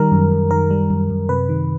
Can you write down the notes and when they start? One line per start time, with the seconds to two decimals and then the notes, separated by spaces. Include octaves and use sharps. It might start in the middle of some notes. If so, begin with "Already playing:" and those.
Already playing: D#3 G3 A#4
0.11 F#2
0.32 F#2
0.51 D#3 A#4
0.71 G3
0.90 F#2
1.10 F#2
1.29 C3 B4
1.49 D#3